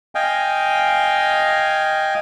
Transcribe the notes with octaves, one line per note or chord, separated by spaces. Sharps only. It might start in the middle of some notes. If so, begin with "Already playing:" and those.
D#5 F5 G5 G#5